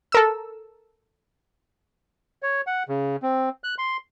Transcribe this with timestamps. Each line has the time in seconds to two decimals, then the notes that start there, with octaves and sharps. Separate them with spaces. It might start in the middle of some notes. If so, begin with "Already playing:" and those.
0.12 A4 A#4 E6
2.43 C#5
2.67 F#5
2.88 C#3
3.22 C4
3.64 F#6
3.78 C6